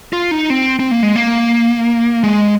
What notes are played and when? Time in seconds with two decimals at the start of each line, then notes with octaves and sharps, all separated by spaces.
0.13 F4
0.31 D#4
0.50 C4
0.79 C4
0.91 A#3
1.03 G#3
1.16 A#3
2.23 G#3